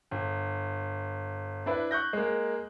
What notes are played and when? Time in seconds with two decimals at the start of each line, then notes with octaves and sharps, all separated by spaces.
0.11 G1
1.66 D4 E4 B4
1.91 C#6 F#6 G6 A#6
2.13 G#3 A#3